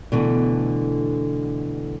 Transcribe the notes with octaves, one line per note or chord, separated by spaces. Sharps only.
B2 D3 E3 A3